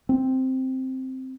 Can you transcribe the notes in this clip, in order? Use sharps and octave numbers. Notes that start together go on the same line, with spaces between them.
C4